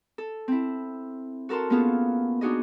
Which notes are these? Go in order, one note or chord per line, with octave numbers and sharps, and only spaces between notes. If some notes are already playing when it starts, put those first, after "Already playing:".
A4
C4 E4
F#4 A4 A#4 A5 C6
A#3 B3 C#4 F4 G#4 A4
D4 D#4 F#4 G#4 D#5